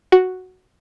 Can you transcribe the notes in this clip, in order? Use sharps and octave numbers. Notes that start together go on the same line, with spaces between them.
F#4